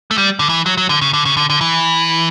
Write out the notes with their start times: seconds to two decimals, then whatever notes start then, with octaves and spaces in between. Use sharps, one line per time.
0.11 A3
0.18 G3
0.39 D3
0.49 E3
0.66 F#3
0.78 F#3
0.89 D3
1.01 C#3
1.13 D3
1.25 C#3
1.37 D3
1.50 D3
1.61 E3